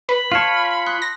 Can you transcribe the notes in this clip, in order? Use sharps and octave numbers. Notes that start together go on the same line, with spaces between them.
B4 B5
F4 C#5 A5 F6
C6 D#6 F#6
A#6